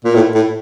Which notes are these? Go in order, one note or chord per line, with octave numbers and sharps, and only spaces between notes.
A#2
A2
A2